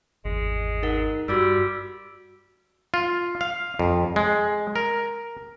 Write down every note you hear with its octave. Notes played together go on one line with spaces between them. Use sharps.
G#1 E2 G#3
D#4 A#4 F#5
G2 G3 F#4 D6 E6
F4
F5
F2
G#3
A#4